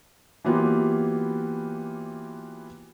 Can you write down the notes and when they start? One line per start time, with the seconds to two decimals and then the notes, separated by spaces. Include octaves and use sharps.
0.45 E3 F#3 A#3 B3 F4 G4